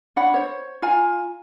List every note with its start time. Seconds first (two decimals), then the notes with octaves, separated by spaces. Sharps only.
0.16 D4 C#5 F#5 B5
0.34 C5 C#5
0.82 F4 F5 G#5 A#5